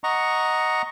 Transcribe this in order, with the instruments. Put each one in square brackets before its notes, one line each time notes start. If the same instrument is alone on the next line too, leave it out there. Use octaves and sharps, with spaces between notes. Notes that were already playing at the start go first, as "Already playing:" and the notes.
[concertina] D#5 F#5 A#5 C#6